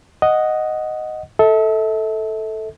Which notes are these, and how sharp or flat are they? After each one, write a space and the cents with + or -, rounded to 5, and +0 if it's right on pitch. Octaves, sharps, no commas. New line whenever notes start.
D#5 +0 F#5 +0
A4 +0 E5 -40